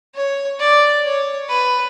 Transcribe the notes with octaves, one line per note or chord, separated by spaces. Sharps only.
C#5
D5
C#5
B4